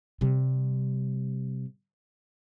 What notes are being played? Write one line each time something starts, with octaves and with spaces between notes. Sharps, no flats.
C3 G3